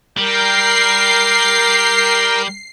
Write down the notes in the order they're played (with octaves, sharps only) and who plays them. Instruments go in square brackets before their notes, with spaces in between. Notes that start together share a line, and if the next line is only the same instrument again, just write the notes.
[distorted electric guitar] G3 [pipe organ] A#4 G5 [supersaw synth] C7